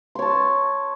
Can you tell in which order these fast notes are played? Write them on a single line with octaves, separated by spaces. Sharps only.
C6 C#5 A5